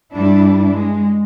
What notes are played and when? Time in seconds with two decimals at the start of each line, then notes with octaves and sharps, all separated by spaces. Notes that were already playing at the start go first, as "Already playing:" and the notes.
0.14 G2 G3 D4 E4
0.74 G#3